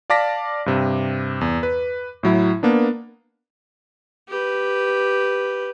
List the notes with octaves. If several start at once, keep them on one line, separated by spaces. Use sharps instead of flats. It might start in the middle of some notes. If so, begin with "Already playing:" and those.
D5 F5 A5 D6 A#6 B6
G2 C3
E2
B4
A2 F#3 E4
A#3 B3 D4
G4 B4